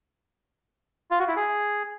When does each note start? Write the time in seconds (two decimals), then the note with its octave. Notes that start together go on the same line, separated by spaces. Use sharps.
1.11 F4
1.19 F#4
1.28 E4
1.36 G#4